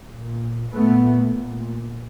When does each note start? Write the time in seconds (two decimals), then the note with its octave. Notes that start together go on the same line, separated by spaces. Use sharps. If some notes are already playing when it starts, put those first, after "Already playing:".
0.09 A#2
0.73 A#2 A3 B3
1.36 A#2